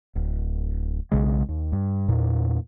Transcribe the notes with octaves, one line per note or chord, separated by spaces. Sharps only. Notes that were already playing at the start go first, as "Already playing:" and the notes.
D1
B1 C#3 G#3
D#2
G2
E2 A#2